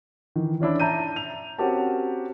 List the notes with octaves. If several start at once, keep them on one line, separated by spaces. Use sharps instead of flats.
D#3 E3
E3 C#4 D4 E4
E5 A5 A#5 G6 D#7
F7
C4 C#4 F#4 G4 A#4 A5